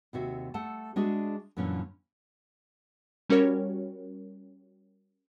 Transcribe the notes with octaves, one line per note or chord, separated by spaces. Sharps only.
D#2 C3 F#4 E5
A3 A4 F#5 A5
G#3 D4 F#4 G#4 E5
F#2 A#2 D3 E3 C#4
G3 C#4 F#4 A#4 C#5